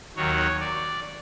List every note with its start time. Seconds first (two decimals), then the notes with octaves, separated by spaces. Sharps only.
0.16 D#2 D#3 F#3 C#5
0.60 D5